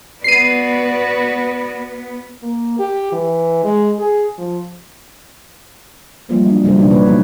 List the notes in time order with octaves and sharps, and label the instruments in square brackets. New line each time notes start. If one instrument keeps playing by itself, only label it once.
[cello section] B3 [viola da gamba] F#4 B4 D5 [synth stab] C7 D#7
[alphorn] A#3
G4
E3
G#3
G#4
F3
[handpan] E3 F3 G3 A3 A#3 F4
F#3 D4 D#5
C#3 G3 E4 A4 C5
B2 E3 D4 D#4 G4
E3 A#3 E4 G4 B4 C#5
F3 F#3 A#3 D4 D#4